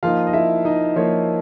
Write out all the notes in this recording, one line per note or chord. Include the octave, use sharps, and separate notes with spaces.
F3 A#3 D#4 F4 F5
D#5
E4 E5
D#4 D#5
F3 A#3 D#4 C#5